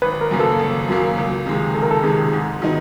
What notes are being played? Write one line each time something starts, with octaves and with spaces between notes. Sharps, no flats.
G#1 B4
A#4
F#2 C#3 F#3 A#3
A4
G#1
F#2 C#3 F#3 A#3
C#2
C3 D#3 G#3
C#2 A4
A#4
A4
C3 D#3 G#3 G#4
G#2
D#3 F#3 B3 D#4